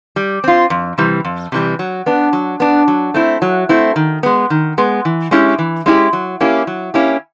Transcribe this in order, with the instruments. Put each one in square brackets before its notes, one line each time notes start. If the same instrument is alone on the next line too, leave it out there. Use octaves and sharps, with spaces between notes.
[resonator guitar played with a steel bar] G3
C4 F4
F2
C3 E3 G3
F2
C3 E3 G3
F#3
B3 D4
F#3
B3 D4
F#3
A3 C4 E4
F#3
A3 C4 E4
D#3
G#3 B3
D#3
G#3 B3
E3
G#3 C#4 E4 G4
E3
G#3 C#4 E4 G4
F#3
A#3 C#4 E4 G4
F#3
A#3 C#4 E4 G4